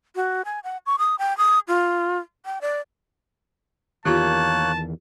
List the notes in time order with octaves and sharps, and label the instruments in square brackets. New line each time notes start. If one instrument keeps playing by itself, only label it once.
[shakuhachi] F#4
G#5
F#5
C#6
D#6
G5
D#6
F4
G5
D5
[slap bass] E2 D#3 [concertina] A#3 C#5 F#6 [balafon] F4 G4 [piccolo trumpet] A5